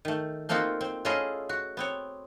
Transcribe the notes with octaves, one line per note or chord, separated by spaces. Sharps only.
D#3 A3
A3 A#3 C4 D#4 F4 F#4
C4
A3 C#4 E4 F4 G#4 D#5
F#4
B3 C4 C#5